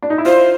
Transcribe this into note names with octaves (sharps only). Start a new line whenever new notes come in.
D4
D#4
E4
F4 C5